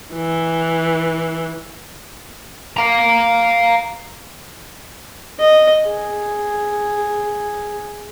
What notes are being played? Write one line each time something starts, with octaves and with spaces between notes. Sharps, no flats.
E3
F5 A#5
D#5
G#4